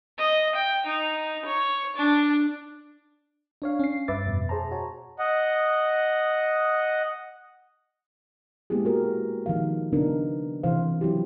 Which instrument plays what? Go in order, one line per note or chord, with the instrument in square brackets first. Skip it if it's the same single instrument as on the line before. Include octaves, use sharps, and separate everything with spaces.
[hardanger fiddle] D#5
G5
D#4
C#5
D4
[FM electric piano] D4 C#5 F5
C#4 C7
G2 B4 E5 D6 A6
F2 B2
G#4 C5 A5 A#5
F#4 C#5
[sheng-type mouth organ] D#5 F#5
[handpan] G#3 A#3 B3 E4 G4 G#4
F#4 G4 A#4
D#3 F3 F5
C#3 B3 D4 D#4 A#4
C3 E3 C5 F5
F#3 E4 G4